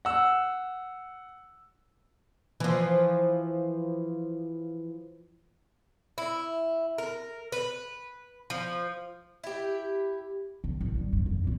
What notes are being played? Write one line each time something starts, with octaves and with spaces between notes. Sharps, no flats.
F#5 E6
E3 F3
E4
A#4
B4
F3
E4 G4
C3
A1 D#3
G3
G2
F2
A#2 F4